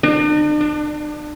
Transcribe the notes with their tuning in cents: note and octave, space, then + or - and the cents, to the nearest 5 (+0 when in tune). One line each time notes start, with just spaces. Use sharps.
D4 +45
D4 +20